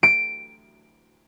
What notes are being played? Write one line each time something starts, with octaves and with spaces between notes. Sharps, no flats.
D7